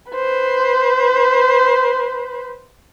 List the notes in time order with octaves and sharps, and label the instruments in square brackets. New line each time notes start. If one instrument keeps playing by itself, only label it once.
[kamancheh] B4 C5